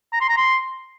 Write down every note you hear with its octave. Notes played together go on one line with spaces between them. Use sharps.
A#5
C6
A#5
C6